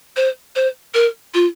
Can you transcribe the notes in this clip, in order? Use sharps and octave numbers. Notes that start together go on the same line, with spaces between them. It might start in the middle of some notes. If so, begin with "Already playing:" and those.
C5
C5
A#4
F4